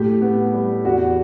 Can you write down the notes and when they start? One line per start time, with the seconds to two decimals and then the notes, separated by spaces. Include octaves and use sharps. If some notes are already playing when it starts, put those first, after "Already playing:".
Already playing: A2 G4
0.21 B3
0.54 G3
0.85 E2 F#4